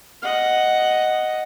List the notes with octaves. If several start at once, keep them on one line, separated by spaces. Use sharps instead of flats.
D#5 F#5